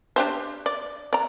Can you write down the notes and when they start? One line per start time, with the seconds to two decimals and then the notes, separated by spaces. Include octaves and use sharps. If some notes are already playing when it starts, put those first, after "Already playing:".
0.16 D4 G4 C5
0.66 D5
1.13 D5 A#5